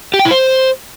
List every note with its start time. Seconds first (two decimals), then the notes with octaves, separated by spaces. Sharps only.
0.14 G4
0.19 G5
0.25 E4
0.31 C5